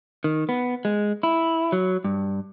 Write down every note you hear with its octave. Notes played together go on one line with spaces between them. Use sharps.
D#3
B3
G#3
E4
F#3
G2